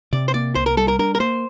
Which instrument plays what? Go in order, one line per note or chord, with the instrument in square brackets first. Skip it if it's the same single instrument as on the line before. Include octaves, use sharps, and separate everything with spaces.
[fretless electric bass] C3 [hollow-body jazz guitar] D5
[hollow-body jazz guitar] C5
[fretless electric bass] A#3 [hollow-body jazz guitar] D5
[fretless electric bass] C2 [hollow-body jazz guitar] C5
[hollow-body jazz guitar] A#4
[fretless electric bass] G3 [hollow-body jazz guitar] A4
[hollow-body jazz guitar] A#4
[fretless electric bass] D4 [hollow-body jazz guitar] A#4
[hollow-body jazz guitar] A#4
[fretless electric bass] A#3 [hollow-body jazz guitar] C5